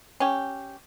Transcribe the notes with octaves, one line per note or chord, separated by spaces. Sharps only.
C#4 G4